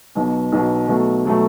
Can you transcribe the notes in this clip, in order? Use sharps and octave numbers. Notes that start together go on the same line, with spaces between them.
B1 B2 F#3
B1 B2 F#3
B2 F#3 A3
B2 F#3 A3